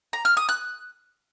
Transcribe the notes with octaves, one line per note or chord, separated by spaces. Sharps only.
A#5
F6
D#6
F#6